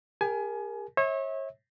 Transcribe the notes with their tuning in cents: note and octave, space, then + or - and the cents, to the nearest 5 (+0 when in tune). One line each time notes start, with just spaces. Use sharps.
G4 +45 A#4 +0 G#5 +30
C#5 -35 E5 -35